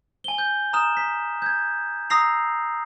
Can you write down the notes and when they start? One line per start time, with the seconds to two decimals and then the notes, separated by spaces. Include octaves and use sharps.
0.24 G#5 G7
0.38 G6
0.73 A#5 D#6 F6 E7
0.97 B6
1.42 G6 G#6
2.10 A#5 D#6 E6 A#6 C7 F7